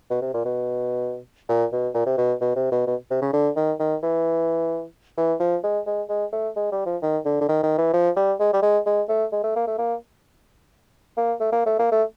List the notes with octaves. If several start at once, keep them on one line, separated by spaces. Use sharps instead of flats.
B2
C3
A#2
B2
A#2
B2
A#2
C3
B2
B2
C3
B2
B2
C3
C#3
D3
D#3
D#3
E3
E3
F3
G#3
G#3
G#3
A3
G#3
G3
F3
D#3
D3
D3
D#3
D#3
E3
F3
G3
G#3
G3
G#3
G#3
A3
G#3
A3
A#3
A3
A#3
A#3
A3
A#3
A3
A#3
A3